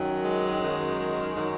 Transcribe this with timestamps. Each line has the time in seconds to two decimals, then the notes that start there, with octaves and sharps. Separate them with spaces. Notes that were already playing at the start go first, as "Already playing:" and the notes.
Already playing: F#2 D#3 F#3
0.22 G#3
0.60 F#2 D#3 F#3
1.34 D#3 F#3